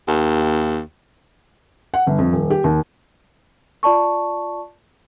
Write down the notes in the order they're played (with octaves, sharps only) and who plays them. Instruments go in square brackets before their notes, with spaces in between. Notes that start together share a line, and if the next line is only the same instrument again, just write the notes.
[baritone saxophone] D#2
[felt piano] F#5
G1
F2
D#1
G4
D#2
[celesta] F4 D5 A5 C#6